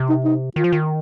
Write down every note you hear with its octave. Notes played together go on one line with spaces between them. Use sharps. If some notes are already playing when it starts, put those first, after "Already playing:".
Already playing: C3
D#4
D#4
D#3 F4
F3
D#3